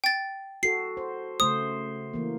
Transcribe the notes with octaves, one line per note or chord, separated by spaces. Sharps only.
G5 A6
F#4 A4 C7
C5
C#3 A3 C5 D#6
E3 A#3